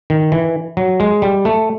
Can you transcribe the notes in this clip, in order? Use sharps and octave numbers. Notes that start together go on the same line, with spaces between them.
D#3
E3
F#3
G#3
G3
A3